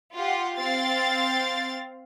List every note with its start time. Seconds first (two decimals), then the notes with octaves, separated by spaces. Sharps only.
0.15 F4 G4 F#5
0.56 C4 F5 A6